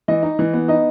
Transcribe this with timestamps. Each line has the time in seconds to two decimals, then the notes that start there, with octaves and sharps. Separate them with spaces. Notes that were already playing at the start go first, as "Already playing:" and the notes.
0.08 E3 D#5
0.23 D#4
0.39 E3
0.53 B3
0.68 D#4 D#5